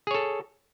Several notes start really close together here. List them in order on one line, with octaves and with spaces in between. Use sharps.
G#4 C#5 A4